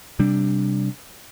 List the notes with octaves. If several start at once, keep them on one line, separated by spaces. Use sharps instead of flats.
C3 G3 D4